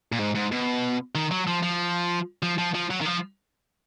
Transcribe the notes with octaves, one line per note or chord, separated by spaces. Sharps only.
A#2
G#2
G#2
B2
D#3
F#3
F3
F3
F3
F3
F3
F#3
D#3
F3